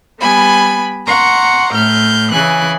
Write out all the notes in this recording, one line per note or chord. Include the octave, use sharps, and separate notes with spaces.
G3 B3 G#5 B5
F#5 A#5 C6 C#6
A2 F6 G6
C#3 E3 G#5 F#6